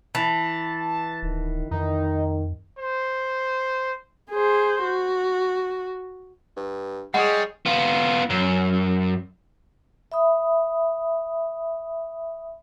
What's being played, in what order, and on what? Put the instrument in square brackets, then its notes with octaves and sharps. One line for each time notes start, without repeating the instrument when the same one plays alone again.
[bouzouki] E3 [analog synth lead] A5
[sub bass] D1 [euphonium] D#3
[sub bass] F2 [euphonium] D#3 [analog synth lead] D#4
[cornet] C5
[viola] G#4 C5
F#4
[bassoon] G2
[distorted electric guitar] G3 [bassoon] G#3 [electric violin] G#4 C#5 [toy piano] F#5
[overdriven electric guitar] B3 F4
F#2
[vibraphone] E5 B5 D#6